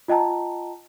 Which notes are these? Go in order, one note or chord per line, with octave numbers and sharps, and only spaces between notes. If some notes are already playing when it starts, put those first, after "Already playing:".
F4 D#5 G5 A5 A#5